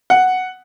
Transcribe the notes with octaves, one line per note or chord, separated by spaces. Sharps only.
F#5